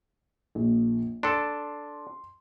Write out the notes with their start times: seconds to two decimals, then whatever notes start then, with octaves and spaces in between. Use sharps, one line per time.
0.55 A#1
1.23 D4 A4 C6